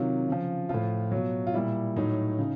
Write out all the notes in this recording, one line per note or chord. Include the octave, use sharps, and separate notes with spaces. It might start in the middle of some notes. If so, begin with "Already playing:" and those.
Already playing: C3 D#3 F#3 F4
C#3 F3
A2 F3 F4
B2 F#3
F4
A#2 G3 E4
A2 F#3 D#4
C#3